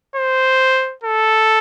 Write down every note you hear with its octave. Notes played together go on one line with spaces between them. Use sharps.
C5
A4